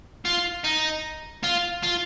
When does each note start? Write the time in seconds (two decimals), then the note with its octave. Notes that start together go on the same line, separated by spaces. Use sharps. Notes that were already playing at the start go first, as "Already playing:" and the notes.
0.25 F4
0.64 D#4
1.44 F4
1.83 F4